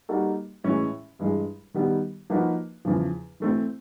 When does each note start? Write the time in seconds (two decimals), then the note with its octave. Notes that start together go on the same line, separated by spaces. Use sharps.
0.09 G3 A#3 D#4 F#4 A4
0.64 A2 E3 G#3 C#4
1.19 G2 E3 G#3
1.74 D#3 G3 B3 D#4
2.30 F3 A#3 D#4 F#4 B4
2.85 E2 C#3 F3
3.40 E3 A3 C4